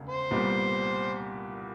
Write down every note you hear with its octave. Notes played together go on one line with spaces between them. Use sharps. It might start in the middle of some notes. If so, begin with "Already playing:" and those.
Already playing: E1 D2 C#3
C5
C2 A#2 G3 B3